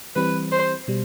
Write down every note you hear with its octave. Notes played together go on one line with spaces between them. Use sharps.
E3 G3 C4 B4
C5
B2 G3